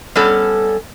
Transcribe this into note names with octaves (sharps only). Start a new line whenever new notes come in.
G3 B3 C#4 A4